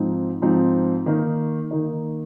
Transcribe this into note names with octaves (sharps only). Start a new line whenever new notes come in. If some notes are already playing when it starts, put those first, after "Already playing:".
Already playing: G#2 F3 C4 D#4
G#2 F3 C4 D#4
D#3 A#3 D#4
D#3 A#3 D#4